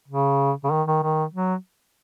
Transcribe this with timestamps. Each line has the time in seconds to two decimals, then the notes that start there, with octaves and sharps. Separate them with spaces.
0.08 C#3
0.64 C#3
0.72 D#3
0.87 D#3
1.03 D#3
1.33 F#3